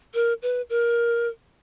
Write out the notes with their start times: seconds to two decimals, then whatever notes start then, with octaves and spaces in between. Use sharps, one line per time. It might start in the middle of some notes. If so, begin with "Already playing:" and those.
0.14 A#4
0.42 B4
0.70 A#4